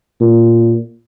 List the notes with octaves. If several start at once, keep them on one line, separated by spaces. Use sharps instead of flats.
A#2